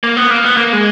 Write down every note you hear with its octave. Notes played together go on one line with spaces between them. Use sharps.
A#3
B3
A#3
B3
A#3
G#3